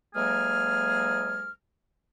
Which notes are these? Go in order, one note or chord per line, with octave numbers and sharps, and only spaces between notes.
D2 F#3 G#3 A#3 G#4 F6